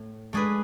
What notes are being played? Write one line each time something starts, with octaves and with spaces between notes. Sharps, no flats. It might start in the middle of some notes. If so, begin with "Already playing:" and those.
Already playing: A2 A3
G#3 A3 D4 G#4 B4